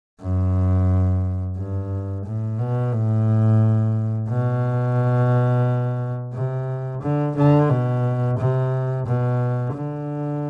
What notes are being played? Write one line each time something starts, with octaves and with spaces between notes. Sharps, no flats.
F#2
G2
A2
B2
A2
B2
C3
D3
D3
B2
C3
B2
D3